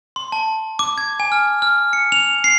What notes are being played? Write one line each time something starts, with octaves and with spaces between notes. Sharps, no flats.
C6
A5
D6
G#6
G#5
F6
F6
C#7
F7
C7